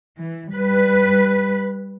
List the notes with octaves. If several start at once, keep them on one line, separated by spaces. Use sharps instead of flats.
E3
G3 B4